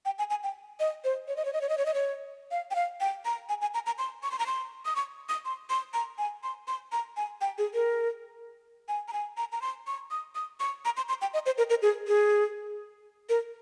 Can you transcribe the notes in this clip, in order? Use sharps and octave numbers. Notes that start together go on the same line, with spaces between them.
G5
G#5
G#5
G5
D#5
C5
C#5
D#5
C#5
D#5
C#5
D#5
C#5
D#5
C#5
F5
G5
F5
G5
A#5
G#5
G#5
A#5
A#5
C6
C#6
C6
A#5
C6
D#6
C#6
D#6
C6
C6
A#5
G#5
C6
C6
A#5
G#5
G5
G#4
A#4
G#5
A#5
G#5
A#5
A#5
C6
C#6
D#6
D#6
C#6
A#5
C6
C6
G5
D#5
C5
A#4
A#4
G#4
G#4
A#4